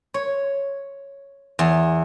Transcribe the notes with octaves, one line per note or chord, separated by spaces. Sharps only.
C#5
E2